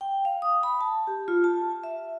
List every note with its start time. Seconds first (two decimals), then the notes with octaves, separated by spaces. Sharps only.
0.01 G5
0.25 F5
0.42 D#6
0.63 B5
0.81 A5
1.07 G4
1.28 F4
1.44 A5
1.84 E5